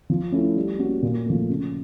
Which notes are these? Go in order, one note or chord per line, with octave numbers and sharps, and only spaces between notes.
F3
A3 C#4 E4
G3
A#3 C#4 F#4
A#2
F3 A3
C#3